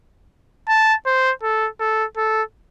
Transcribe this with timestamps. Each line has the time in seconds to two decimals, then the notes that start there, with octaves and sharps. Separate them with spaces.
0.69 A5
1.06 C5
1.43 A4
1.80 A4
2.17 A4